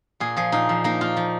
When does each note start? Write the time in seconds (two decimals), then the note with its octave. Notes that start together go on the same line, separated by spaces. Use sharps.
0.20 A#2 G#4
0.36 F3 G#4
0.52 A#2 D#4
0.69 F3
0.84 A#3 D#4
1.01 A#3 F4
1.17 F3